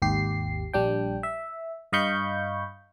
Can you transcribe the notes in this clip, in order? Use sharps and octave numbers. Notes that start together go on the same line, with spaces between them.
G#1 D#2 G4 C7
A#1 G3 D4 G5
E5
G2 D#5 F5 B5 C#6 G6